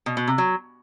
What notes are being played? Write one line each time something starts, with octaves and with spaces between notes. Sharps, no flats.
B2
B2
C3
F#3